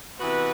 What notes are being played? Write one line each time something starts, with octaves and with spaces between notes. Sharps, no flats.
C3 E3 B3 F#4 B4